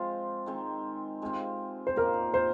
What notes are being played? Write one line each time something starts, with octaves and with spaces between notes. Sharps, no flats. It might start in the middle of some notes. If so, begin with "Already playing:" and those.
Already playing: F3 G#3 C4 F4
D#3 G#3 C4
C3 G#3 C4 F4
C5
A#2 A#3 D#4 A#4
C5